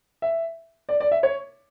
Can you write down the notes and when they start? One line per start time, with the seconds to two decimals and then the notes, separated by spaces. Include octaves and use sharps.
0.22 E5
0.89 D5
1.00 D5
1.12 E5
1.23 C#5